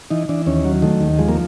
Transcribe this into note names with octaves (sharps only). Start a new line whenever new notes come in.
E3 D#4
E3 D4
D#2 C#4
F#3
D#3 A3
D#2
F3 G#3
A#3